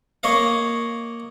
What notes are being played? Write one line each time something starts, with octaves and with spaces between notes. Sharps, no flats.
A#3 C#5 D#5 F5